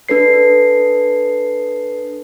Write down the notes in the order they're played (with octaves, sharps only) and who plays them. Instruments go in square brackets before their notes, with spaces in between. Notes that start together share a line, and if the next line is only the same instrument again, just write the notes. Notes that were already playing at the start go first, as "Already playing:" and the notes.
[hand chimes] D4 A4 B4 C7